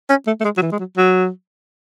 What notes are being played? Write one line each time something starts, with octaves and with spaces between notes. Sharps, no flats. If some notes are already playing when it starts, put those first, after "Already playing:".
C#4
A3
A3
G#3
F#3
E3
G#3
F#3
F#3